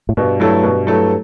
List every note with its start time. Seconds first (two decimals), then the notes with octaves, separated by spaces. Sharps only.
0.09 A2
0.17 G2 B2
0.40 F#3 A3 E4 A4
0.63 B2
0.87 F#3 A3 E4 A4